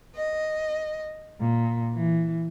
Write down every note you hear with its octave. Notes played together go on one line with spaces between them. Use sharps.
D#5
A#2
E3